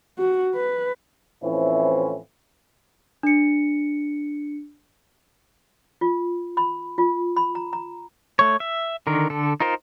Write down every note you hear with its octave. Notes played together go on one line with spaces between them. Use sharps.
F#4
B4
A2 E3 F3 C4 C#4 E4
D4 C#7
F4
B5
F4
B5
A#5
A#5
A3 C#5
E5
D3 D#3 A#4
D3 A4
D#4 F4 A#4 C5